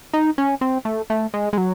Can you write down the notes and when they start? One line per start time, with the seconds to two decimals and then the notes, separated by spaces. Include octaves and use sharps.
0.13 D#4
0.38 C#4
0.61 C4
0.85 A3
1.10 A3
1.34 G#3
1.53 G#3
1.58 F#3